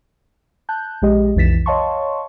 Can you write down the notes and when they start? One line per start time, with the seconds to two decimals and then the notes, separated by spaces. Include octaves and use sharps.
0.69 A5 F#6 G6
1.02 A#1 G#3 G4 D#5
1.36 B1 F2 E3 A6 B6 E7
1.66 C#5 D#5 F5 A5 C6 C#6